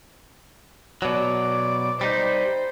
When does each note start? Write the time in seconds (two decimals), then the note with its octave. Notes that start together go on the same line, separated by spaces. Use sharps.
1.02 B2 F#3 D5
2.01 G3 D#4 C5